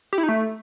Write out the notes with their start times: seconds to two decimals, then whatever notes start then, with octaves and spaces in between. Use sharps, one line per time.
0.13 G4
0.18 E4
0.23 D#4
0.29 A3